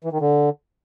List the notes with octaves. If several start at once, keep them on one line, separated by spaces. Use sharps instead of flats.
E3
D#3
D3